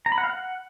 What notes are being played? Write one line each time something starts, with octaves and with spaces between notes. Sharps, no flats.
A#5
B5
F#5
F5
F#5